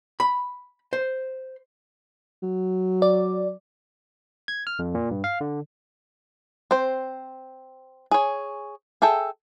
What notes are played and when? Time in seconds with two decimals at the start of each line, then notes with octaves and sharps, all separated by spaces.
0.20 B5
0.93 C5
2.43 F#3
3.02 D5
4.48 G#6
4.67 F6
4.79 F2
4.95 A#2
5.11 G2
5.24 F5
5.41 D3
6.71 C4 C5
8.11 G#4 C#5
9.02 G#4 A4 E5 G5